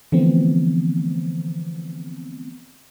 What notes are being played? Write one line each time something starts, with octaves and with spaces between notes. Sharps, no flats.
D3 E3 F3 A3 B3 C4